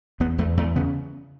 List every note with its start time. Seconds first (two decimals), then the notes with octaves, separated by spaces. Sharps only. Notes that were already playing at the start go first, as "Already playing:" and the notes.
0.20 E2 B3
0.38 E2 A3
0.57 E2 A3
0.76 C#3 B3